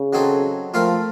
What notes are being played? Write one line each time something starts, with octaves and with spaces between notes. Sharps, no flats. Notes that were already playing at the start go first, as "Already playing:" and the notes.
Already playing: C#3
F#3 C4 D#4 A4
F3 A3 C4 F4 A#4